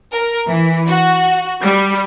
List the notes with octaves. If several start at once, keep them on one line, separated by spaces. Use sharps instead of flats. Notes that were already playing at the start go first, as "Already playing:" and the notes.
A#4
E3
F#4
G3